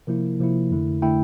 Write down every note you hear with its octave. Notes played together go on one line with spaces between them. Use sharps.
C3 F3 A#3 E4 A#4
C3 F3 A#3 E4
F2 D3 A3 E4
D3 A3 E4 G5